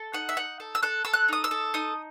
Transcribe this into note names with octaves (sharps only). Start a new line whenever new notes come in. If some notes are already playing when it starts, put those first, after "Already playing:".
Already playing: A4
D#4 F#5
E5
D#4 F#5
A4
E6
A4 F#6
A4 E6
F#6
D#4 D#6
E6
A4
D#4 D#6